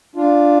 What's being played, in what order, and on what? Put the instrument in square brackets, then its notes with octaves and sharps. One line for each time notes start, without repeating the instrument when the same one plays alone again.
[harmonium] D4 F4